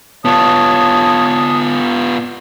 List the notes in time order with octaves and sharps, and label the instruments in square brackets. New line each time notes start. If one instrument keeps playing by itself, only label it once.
[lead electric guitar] B3 F4 [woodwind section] C#5 A5 D#6